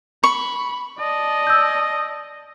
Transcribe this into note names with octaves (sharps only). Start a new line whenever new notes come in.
B5 C#6
D5 D#5 A5
E6 G6